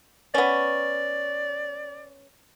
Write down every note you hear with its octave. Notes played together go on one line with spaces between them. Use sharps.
B3 C#4 D5